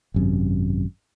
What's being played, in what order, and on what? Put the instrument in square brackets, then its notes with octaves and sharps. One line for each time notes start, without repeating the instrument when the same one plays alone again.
[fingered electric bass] G#1 F#2 C3